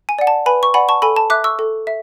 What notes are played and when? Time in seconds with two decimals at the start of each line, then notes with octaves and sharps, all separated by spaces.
0.09 G#5
0.19 D5 F#5
0.27 A5
0.46 B4 G#5 B5
0.63 C#6
0.74 D5 F#5 G#5 B5
0.89 A5 C#6
1.02 A4 G#5 B5
1.16 A5
1.30 E5 D6 F#6
1.44 C#6 E6
1.59 A4
1.87 E5